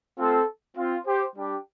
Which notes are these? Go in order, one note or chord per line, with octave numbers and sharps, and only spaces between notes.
A3 C4 F4 A4
C4 F4
G4 C5
G3 D4 G4